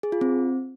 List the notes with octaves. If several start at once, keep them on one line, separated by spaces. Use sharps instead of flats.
G#4
F4
C4